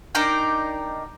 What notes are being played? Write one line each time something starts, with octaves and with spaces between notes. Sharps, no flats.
D4 D#4 A#4 G5